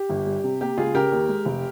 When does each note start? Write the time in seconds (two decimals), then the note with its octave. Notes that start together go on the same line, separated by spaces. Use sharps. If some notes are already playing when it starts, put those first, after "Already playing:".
Already playing: G4
0.09 G1
0.27 G3
0.44 C3
0.61 A#3 G4
0.77 C#2 F4 G#4
0.95 C#3 G4 A#4
1.12 D#2
1.29 G#3
1.45 F1